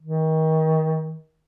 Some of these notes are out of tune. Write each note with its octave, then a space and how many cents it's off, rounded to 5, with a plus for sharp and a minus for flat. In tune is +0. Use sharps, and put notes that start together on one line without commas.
D#3 +30